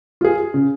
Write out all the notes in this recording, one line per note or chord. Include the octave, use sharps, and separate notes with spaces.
F4 G#4
C#3